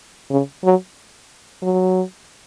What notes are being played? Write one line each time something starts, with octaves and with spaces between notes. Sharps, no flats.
C#3
F#3
F#3